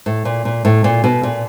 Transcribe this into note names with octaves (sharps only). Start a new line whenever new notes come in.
A2
A#2
A#2
A2
A#2
B2
A#2